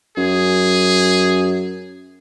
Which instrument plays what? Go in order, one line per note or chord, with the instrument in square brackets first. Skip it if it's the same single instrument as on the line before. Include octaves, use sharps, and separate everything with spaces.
[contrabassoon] F#2 [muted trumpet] G#4